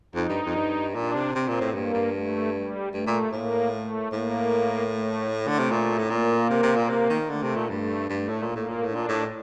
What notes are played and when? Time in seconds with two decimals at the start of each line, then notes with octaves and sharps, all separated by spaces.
0.15 F2 D#4
0.29 G2
0.46 F2
0.56 G2
0.95 A#2 D4
1.15 C3
1.34 C3 C4
1.48 A#2
1.61 A2
1.74 G2 A#3
1.94 G2
2.14 A3
2.53 G3
2.93 G2 A3
3.07 A#2
3.33 A2 A#3
3.72 A3
4.12 A2 A#3
4.91 A3
5.31 A3
5.48 D3
5.59 C3
5.71 A#2
5.98 A2
6.10 A#2 A#3
6.50 C3
6.63 C3
6.76 A#2
6.89 C3
7.09 D#3
7.29 D3 A3
7.42 C3
7.56 A#2
7.69 G2 A3
8.09 G2 A3
8.29 A2
8.42 A#2
8.49 A#3
8.55 A2
8.68 A#2
8.82 A2
8.88 D4
8.95 A#2
9.08 A2